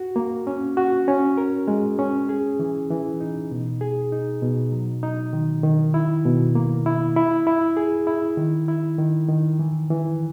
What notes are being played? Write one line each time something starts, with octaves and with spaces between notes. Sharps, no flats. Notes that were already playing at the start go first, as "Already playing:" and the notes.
Already playing: F#4
A#3
C#4
F#4
C#4
A#4
G#3
C#4
G#4
E3
E3
D#4
B2
G#4
D#4
B2
F#3
D#4
D#3
D#3
E4
B2
A#3
E4
E4
E4
G#4
E4
D#3
E4
D#3
D#3
E3
E3